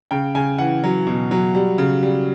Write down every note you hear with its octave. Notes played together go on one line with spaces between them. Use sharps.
C#3 G5
C#3 G#5
E3 F#5
F#3
B2
F#3
G3
C#3
G3